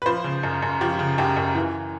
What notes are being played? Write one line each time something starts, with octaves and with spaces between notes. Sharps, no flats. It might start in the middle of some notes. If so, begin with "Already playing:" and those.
B4
F3 C5
C#3
F#2
F#2
F3 G4
C#3
F#2 G4
F#2
E3